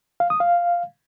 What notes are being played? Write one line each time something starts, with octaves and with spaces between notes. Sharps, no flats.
F5
D#6
F5